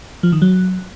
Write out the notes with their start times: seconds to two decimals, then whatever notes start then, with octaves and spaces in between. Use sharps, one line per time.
0.23 F3
0.32 D#3
0.42 F#3